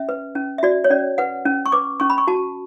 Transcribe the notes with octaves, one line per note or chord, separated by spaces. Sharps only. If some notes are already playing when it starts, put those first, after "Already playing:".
Already playing: C#4 E5
B4
C#4
E5
F#4 D5
C#5
C#4 D5
B4 F#5
C#4
C#6
B4 D6
C#4 C#6
B5
C#6
F#4 A5